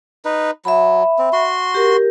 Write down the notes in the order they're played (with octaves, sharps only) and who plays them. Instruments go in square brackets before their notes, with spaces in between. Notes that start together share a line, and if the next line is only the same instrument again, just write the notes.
[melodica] D#4 B4
[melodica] F#3 [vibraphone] E5 B5
[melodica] C4
F#4 C6
[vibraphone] G4 A#4